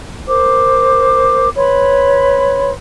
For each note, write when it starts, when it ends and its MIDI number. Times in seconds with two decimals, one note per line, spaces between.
0.28 1.49 70
0.28 1.49 72
0.28 1.49 86
1.56 2.71 71
1.56 2.71 73
1.56 2.71 83
1.56 2.71 84